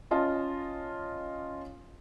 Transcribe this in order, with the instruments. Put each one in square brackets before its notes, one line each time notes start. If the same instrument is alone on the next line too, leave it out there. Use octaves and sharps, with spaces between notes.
[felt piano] C#4 F4 D#5 A5